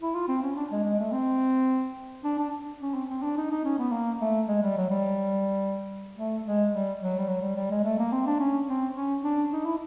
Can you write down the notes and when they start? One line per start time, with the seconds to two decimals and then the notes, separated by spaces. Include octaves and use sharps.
0.01 E4
0.15 F4
0.28 C4
0.43 C#4
0.56 D4
0.71 G#3
0.84 G#3
0.99 A3
1.12 C4
2.24 D4
2.38 D4
2.81 C#4
2.94 C4
3.09 C4
3.23 D4
3.37 D#4
3.51 D#4
3.64 C#4
3.79 B3
3.92 A#3
4.21 A3
4.48 G#3
4.62 G3
4.77 F#3
4.90 G3
6.16 A3
6.45 G#3
6.72 G3
7.01 F#3
7.19 G3
7.28 F#3
7.42 G3
7.56 G3
7.71 G#3
7.84 A3
7.99 A#3
8.12 C4
8.27 D4
8.39 C#4
8.68 C4
8.96 C#4
9.24 D4
9.52 D#4
9.66 E4